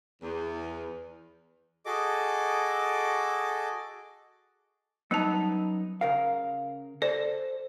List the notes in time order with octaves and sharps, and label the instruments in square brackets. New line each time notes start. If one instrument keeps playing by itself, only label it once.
[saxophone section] E2
[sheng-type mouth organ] F#4 G#4 A4 D#5 D6
[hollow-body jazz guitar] F#2 B3 D#4 [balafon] G3 A5
[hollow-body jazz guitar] C#3 A#4 F5
[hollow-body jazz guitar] A4 C5 [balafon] D5